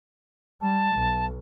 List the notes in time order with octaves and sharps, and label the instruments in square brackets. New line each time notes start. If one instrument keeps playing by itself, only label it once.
[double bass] G3 [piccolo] A5
[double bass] B1